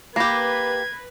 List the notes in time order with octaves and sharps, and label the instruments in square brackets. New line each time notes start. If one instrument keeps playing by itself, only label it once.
[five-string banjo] A#3 G4 [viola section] B4 [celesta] B5 A#6 C7 [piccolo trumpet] G#6